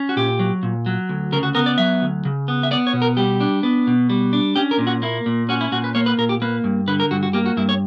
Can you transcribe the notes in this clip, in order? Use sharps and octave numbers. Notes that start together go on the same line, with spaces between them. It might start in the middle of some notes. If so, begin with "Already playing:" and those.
Already playing: C#4
F#4
A#2 G4
F#3
A#2
F#3
D2
C#3 A#4
F#4
B3 A#4
D5
F#3 E5
D2
C#3
B3
E5
B3 D5
C#5
B2
A#4
G3 G4
D4
B3
B2
G3
D4
C#4 G4
A#4
A#2
F#4
A#3 E4
A#2
C#4 F#4
E4
A#2 F#4
B4
A#3 C#5
B4
A#2 A#4
G4
A#3 B4
G2
D3 B4
A#4
G2 F#4
F#4
A#3 G4
F#4
G2 E4
C#5